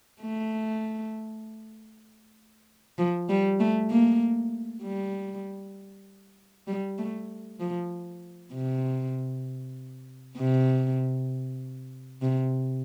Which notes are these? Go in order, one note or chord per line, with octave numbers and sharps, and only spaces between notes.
A3
F3
G3
A3
A#3
G3
G3
A3
F3
C3
C3
C3